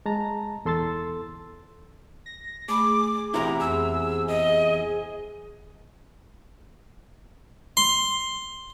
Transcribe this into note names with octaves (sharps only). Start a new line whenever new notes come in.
G#3 A5 A#5
E2 A4 C6 E6 A6
A#6
A3 G#4 B5 D6
E2 C3 E4 A#5
F2 E6
D#5
C6